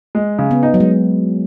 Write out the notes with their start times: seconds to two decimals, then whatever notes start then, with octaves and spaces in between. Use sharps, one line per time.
0.15 G#3
0.39 C#3
0.51 B3
0.63 D#4
0.74 F#3
0.80 G#3